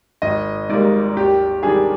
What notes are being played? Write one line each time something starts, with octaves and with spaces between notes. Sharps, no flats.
G#1 D#5
G#2 G3 A#3 D5
D#2 G4
D#3 G3 D4 G#4